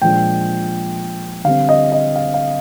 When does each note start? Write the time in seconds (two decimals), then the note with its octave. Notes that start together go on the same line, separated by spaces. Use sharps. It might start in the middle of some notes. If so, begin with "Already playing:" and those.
0.02 A#2 F3 G#3 D4 G5
1.44 D3 G3 C4 F5
1.69 D#5
1.92 D#5
2.16 F5
2.34 F5